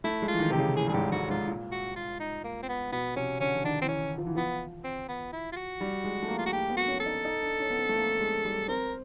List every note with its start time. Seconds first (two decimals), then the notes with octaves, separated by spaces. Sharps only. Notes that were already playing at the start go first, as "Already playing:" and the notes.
0.04 A3 E4
0.22 G#3
0.28 F4
0.33 E3
0.39 D#3
0.50 C3 G4
0.59 C#3
0.76 A2 G#4
0.87 G2 G#4
0.94 G#2 G4
1.12 G#2 F#4
1.30 G#2 F4
1.48 A#2
1.72 F#4
1.96 F4
2.20 D#4
2.44 A#3
2.62 C4
2.68 B3
2.92 B2 B3
3.16 C3 C#4
3.40 D3 C#4
3.55 D3
3.64 D#3 D4
3.81 E3 C4
3.88 C#4
4.18 F3
4.27 E3
4.35 F3 B3
4.84 C4
5.08 B3
5.33 E4
5.52 F4
5.56 F#4
5.81 G3
6.04 G#3
6.23 A3
6.28 A#3
6.38 F4
6.46 F#4
6.52 A#3 G4
6.70 B3
6.77 F#4
6.88 C#4
7.00 A4
7.06 D#4
7.25 D#4
7.42 D4
7.60 C#4
7.70 B3
7.79 C4
7.89 A3
7.96 A#3
8.20 G#3
8.45 G3
8.68 C4 A#4